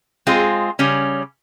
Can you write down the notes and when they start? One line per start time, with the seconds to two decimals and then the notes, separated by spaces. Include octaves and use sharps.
0.27 G#3 C4 F4 G#4
0.79 C#3 G3 C#4